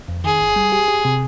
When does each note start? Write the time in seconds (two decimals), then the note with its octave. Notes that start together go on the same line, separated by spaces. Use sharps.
0.08 F2
0.24 D#3 G#4
0.40 G1
0.56 G3
0.72 G4
0.88 G4
1.05 C3